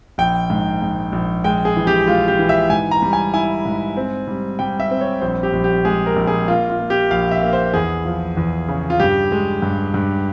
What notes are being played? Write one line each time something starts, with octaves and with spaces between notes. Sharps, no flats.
A#1 G5
G#2
G#2
A#1
G#3 G5
G#4
E3
G4
G#3 F4
G4
E3
E5
G#2 G#5
A#5
G3
G#5
E4 G#5
G#2
C4
G3
G3 G5
E5
C4
C#5
A#1 C5
G4
A#1
G4
G#3 G#4
A#4
A#1
G#4
A#3 F4
F4
A#3
G4
A#1 F5
E5
A#3
C5
E2 G#4
F3
E2
C#3
F4
G2 G4
G#3
G2
G2